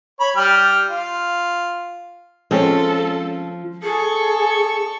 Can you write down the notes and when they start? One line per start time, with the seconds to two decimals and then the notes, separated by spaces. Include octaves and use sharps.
0.20 C#5 B5
0.37 G3 G5 F6
0.89 F4
2.51 F3 G#3 C4 C#4 A4
3.84 G#4 A4 C#6